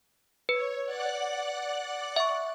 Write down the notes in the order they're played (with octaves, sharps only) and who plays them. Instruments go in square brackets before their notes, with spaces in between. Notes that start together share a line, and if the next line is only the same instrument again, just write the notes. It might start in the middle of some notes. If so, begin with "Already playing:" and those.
[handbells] B4 [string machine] C#5
[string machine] D5 F#5 F#6
[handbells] E5 C#6